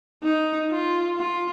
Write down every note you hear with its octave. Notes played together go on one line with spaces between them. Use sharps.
D#4
F4
F4